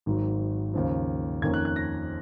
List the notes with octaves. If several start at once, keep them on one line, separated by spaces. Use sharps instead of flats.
G#1 G#2 D#3 F#3
D#2 C#3 F3
F2 D#3 A#3 C#4 G#6
F#6
F#6
A#6